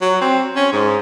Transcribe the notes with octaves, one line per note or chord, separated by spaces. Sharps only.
F#3
C4
C#4
G#2